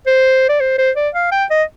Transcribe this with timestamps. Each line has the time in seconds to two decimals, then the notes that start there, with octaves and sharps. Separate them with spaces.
0.06 C5
0.49 D5
0.60 C5
0.78 C5
0.96 D5
1.14 F5
1.32 G5
1.50 D#5